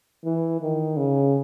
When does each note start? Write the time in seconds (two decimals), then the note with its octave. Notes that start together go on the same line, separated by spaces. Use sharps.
0.24 E3
0.61 D#3
0.97 C#3